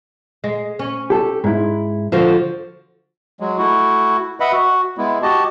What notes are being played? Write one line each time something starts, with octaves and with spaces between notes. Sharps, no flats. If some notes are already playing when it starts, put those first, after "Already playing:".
G#3
C#4
G4 A4
G#2 E4
D3 F3 F#4 C5
F#3 G#3
A3 E4 F#4
B4 D#5 E5 F#5 B5
F#4
G#3 B3 E4
F#4 G4 D#5 A5